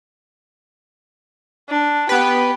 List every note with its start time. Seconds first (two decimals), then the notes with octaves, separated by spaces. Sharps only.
1.69 D4
2.09 B3 G4 B4